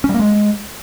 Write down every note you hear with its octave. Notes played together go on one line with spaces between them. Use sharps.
C#4
G3
A#3
G#3